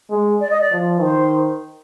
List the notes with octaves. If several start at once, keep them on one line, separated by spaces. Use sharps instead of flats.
G#3
D5
D#5
D5
F3
D#3 C5